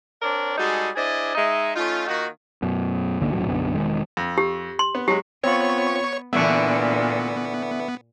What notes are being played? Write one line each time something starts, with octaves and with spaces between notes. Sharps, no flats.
C4 D4 A#4 C#5 D5
G3 G#3 D#4 F#4 G#4 A4
D4 E4 G#4 C5 D5 D#5
G#3 D#4 D#5 E5
A3 C#4 D#4 F4
D#3 A#3 D#4 F4 F#4
F#2 B2
G1 C#2 D3 A#3
D#1 G#1 A2 F#3
B1 F#2 B2 D3
E1 D#3 G#3
F2
G4
C6
B3
F#3 G#3 G4
B3 C4 F4 C#5 C#6
A#2 D3 E3 B3 D4 E5 C#6